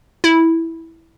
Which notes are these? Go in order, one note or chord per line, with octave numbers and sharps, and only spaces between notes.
E4